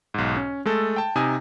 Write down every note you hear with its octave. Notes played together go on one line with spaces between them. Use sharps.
B1 G#2
C#4
G#3 A3 A4
G5 A5
C3 D#4 G#5 D#6